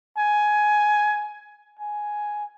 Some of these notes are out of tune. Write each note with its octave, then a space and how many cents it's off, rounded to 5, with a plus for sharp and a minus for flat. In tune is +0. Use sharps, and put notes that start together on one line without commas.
G#5 +15
G#5 +5